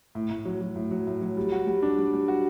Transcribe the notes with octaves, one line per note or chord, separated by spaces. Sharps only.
A2
A2
F#3
F#3
A2
F#3
A2
F#3
G3
F#4
G3
D4
G3
G3
F#4